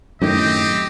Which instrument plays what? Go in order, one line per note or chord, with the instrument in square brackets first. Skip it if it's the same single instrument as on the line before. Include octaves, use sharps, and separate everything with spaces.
[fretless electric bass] F#2 A2 D#3 [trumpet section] C4 G4 D#5